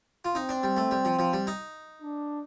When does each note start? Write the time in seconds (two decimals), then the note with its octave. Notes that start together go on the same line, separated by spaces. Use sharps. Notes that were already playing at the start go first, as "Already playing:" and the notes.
0.25 F4
0.35 C4 D#4
0.49 D4
0.63 G3
0.77 A3
0.91 G3
1.05 F3
1.19 F3
1.33 G3
1.47 D#4
2.02 D4